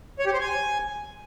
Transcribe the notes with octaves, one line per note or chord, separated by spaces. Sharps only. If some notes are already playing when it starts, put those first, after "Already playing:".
C#5
G4
C5
G#5